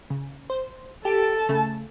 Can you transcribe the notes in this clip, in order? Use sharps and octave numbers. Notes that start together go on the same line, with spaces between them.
C#3
C5
G4 A4 A5 D7
C#3 A3